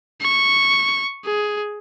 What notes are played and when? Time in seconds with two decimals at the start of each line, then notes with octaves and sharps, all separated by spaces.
0.21 C#6
1.25 G#4